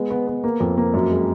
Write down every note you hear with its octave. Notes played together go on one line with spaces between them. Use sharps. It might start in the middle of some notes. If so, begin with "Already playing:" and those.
Already playing: G#3 B3
B3
B3
A#3
F2
A#3
F#2
G#3